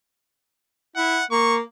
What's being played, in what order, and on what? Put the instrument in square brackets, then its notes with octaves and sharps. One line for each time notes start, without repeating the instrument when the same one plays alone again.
[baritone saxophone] E4 [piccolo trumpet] F#5
[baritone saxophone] A#3 [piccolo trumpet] C#6